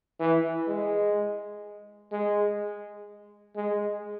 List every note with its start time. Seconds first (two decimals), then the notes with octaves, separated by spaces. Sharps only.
0.20 E3
0.67 G#3
2.12 G#3
3.56 G#3